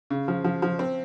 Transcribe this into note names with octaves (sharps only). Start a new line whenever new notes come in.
C#3
F3
F3
F3
C4